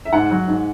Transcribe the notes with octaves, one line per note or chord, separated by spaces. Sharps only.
E5
G#2 F#5
F#3
G#2